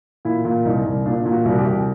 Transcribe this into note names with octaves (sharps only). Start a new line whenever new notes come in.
A#2 E4
A#2
C2 D#4
C2
A#2 D4
A#2
F#4
C2
F#4
G4
C2